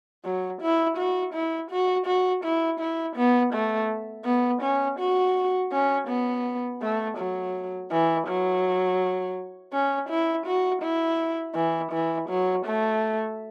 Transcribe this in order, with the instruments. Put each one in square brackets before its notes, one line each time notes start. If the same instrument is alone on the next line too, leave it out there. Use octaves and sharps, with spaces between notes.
[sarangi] F#3
E4
F#4
E4
F#4
F#4
E4
E4
B3
A3
B3
C#4
F#4
C#4
B3
A3
F#3
E3
F#3
C#4
E4
F#4
E4
E3
E3
F#3
A3